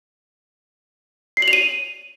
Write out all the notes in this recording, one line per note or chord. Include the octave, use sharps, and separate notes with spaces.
C7
F#7
F7
D#7